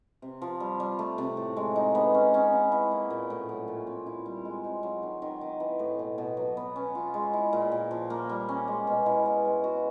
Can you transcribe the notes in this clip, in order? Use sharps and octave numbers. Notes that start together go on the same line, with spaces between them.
C3
F3
G3
G3
A3
C3
A2
G#3
D#4
B3
C#4
C#4
B3
E4
A#3
A#2
A2
F#3
A#2
C4
E4
G3
G#3
C4
F#3
D#3
D#3
D#3
E3
A2
B2
B2
F#3
B3
C#4
F4
G#3
E4
A#2
A#2
F3
A#3
G3
C#4
G#3
B2
E4
B3
G#3
F#4